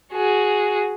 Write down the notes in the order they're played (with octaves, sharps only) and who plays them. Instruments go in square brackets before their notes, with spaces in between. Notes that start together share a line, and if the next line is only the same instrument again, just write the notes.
[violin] F#4 G#4